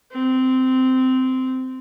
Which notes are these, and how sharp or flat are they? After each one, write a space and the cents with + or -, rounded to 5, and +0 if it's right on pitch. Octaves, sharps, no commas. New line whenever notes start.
C4 -15